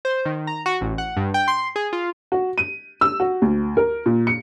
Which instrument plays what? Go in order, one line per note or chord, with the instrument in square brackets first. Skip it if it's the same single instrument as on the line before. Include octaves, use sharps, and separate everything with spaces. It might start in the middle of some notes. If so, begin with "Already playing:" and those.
[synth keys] C5
D#3
A#5
F#4
A1
F#5
G2
G5
C6
G#4
F4
[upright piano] F#4
D#7
E6
F#4
D2
A#4
A#2
C#7